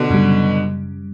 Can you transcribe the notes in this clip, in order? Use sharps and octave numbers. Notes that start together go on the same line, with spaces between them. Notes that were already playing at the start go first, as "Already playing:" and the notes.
Already playing: B2 D3
F#2 C#3 G3